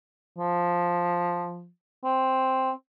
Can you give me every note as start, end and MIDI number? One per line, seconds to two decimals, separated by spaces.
0.38 1.68 53
2.04 2.71 60